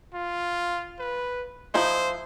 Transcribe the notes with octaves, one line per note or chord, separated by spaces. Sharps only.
F4
B4
F3 D#4 E4 C5